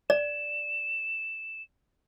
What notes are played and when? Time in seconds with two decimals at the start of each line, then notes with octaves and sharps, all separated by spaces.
0.10 D5 E7